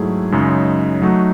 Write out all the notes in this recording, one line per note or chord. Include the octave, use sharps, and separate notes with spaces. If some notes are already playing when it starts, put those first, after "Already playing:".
Already playing: G#2 F#3 A3 E4 G#4
F#2 C#3 G#3 D#4
F#3 A3 D#4 F#4